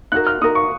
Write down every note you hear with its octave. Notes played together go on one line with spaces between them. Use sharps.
D#4 F#4 A#4 F#6
F6
D#4 F#4 A#4 D#6
C#6